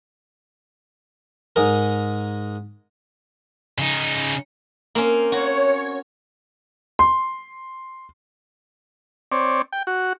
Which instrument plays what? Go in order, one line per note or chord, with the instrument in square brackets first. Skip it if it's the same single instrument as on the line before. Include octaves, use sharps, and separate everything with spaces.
[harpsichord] G#2 G#4 A#4
[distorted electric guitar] C#3 D#4
[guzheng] A#3 C4 C#4
[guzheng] F#4 [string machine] C#5
[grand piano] C6
[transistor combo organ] C4 C#5 D5
G5
F#4